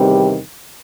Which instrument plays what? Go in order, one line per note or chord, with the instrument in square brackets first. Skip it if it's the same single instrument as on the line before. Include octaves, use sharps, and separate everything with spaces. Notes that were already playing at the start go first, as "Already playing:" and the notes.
Already playing: [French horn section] E2 C3 D#3 G3